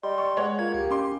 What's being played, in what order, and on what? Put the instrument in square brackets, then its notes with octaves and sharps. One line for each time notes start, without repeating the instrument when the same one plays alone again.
[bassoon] G3 [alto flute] D#5 [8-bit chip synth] C6
[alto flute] D5 [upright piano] C#6
[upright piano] G#3 C#5 F#5
[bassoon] A#3 [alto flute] F4 [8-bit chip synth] G#6
[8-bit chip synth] C#2 [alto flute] G4
[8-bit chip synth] C#4 [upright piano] C6 D6